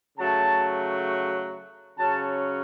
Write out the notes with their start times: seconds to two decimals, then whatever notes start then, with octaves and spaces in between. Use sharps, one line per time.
0.18 C#3 F#3 A3 A5
1.98 C#3 F#3 C#4 A5